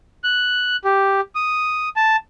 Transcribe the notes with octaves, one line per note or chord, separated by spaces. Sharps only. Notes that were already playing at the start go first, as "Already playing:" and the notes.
F#6
G4
D#6
A5